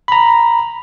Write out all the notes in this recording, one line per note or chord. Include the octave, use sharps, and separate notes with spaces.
A#5 B5